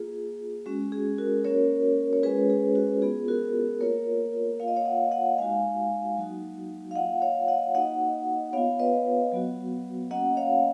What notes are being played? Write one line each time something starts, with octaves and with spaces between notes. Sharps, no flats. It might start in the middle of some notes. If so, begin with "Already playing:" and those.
Already playing: A#3 F4 G#4
G#3 C#4 F#4
G#4
F#4 A#4
A#3 C#4 F#4 A#4 C#5
C#5
G#3 C#4 F4 G#4 B4
G#4
F#4
B3 F4 G#4
F#4 A#4
A#3 F4 A#4 C#5
A#3 F4 F5
D#5
C#5 F5
D#5 F#5
D#5 F#5
G#3 D#4 F#4 F5 G#5
F#3 A#3 D#4 F#4
F5
A#3 F4 D#5 F#5
C#5 F5
D#5 F#5
A#3 D#4 F#4 D#5 F#5
B3 F4 C#5 F5
B4 D#5
F#3 B3 F#4
A#3 C#4 F#4 D#5 F#5
C#5 F5